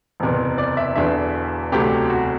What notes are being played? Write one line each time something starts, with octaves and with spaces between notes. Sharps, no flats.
F#1 E2 C3
D5
E5
E1 E2 D3 E5
E1 D2 C3 F#3 A3 G4
F#4